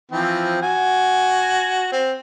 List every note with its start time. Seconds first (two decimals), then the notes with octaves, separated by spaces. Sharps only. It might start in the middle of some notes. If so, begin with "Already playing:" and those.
0.12 E3 F3 C4
0.62 F#4 G#5
1.92 C4